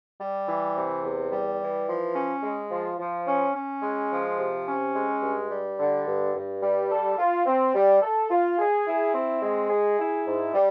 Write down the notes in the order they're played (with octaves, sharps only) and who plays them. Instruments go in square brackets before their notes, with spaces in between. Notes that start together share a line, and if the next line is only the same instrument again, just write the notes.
[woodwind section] G3
E3
C3
E2
G3
E3
F3
C#4
G#3
F3
F3
C#4
C#4
G#3
F3
C3
C#4
G#3
G2
G3
D3
G2
G2
G3
A4
F4
C4
G3
A4
F4
G#4
E4
C4
G#3
G#4
E4
G#2
G3